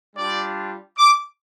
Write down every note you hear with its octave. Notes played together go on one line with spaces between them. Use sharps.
G3 D4 F4 D5
D6